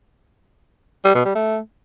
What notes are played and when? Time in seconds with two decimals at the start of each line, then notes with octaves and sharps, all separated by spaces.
1.05 G3
1.15 B2
1.25 G3
1.35 A3